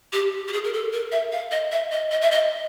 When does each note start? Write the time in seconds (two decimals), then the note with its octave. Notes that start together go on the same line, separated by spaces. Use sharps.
0.13 G4
0.48 G4
0.53 G#4
0.64 A#4
0.73 A4
0.93 A#4
1.12 E5
1.32 F5
1.51 D#5
1.72 E5
1.92 D#5
2.11 D#5
2.21 E5
2.31 D#5